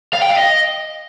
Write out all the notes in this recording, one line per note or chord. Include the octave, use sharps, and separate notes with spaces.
F5
G5
F5
D#5